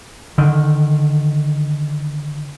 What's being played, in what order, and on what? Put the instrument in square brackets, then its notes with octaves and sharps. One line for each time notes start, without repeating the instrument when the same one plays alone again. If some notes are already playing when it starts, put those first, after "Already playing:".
[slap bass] D3 D#3